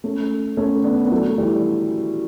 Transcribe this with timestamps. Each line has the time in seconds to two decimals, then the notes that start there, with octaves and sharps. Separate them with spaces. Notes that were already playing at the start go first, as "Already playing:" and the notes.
0.04 A3 C#4
0.57 A3 C#4
0.84 B3 D4
1.05 B3
1.11 F#3 A3
1.38 E3 G3